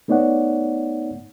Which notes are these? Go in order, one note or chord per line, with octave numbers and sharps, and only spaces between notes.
A3 B3 D#4 C#5 D5 F#5